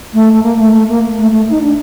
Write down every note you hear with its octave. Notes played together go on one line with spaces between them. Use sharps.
A3
A3
A#3
A3
A3
A#3
A3
A3
D#4
D4